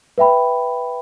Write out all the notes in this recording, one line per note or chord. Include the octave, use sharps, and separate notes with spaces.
B4 E5 G5 B5